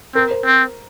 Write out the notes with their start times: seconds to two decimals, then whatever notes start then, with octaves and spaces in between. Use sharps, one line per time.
0.15 C4 A#4
0.31 C5
0.45 C4